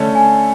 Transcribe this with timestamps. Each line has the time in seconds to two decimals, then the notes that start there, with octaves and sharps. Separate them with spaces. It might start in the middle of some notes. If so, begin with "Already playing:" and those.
Already playing: D3 A3 C#4 D5
0.15 G#5